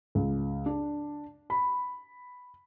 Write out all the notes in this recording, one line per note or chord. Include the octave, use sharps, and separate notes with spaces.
C#2
D4
B5